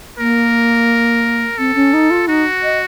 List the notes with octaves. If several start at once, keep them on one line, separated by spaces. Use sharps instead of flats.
A#3 A#4
C4 A4
C#4
D#4
F4
D#4 F#4
D#5